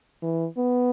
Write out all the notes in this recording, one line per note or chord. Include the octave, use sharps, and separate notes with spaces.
E3
B3